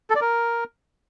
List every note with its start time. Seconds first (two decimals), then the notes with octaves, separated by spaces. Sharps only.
0.10 A4
0.16 D5
0.21 A#4